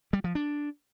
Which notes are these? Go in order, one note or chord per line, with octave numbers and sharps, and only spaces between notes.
G3
F3
D4